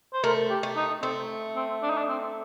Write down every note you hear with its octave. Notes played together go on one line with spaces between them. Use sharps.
C5
A3 A#4
G4
A3
D#4
A3 C4
C4
D4
D#4
D4
C4